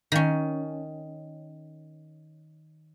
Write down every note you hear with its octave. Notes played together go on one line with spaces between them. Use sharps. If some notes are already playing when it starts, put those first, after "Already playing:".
D#3 C#4